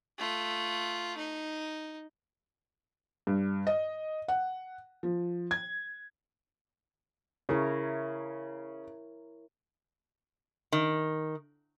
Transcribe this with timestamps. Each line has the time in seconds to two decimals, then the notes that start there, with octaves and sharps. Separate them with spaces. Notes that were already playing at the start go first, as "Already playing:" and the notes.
0.19 A3 F4
1.18 D#4
3.27 G2
3.67 D#5
4.28 F#5
5.03 F3
5.51 G#6
7.49 C#3 E4 A#4 C#5
10.72 D#3